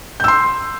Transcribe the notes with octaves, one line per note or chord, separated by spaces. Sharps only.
C6 E6 G6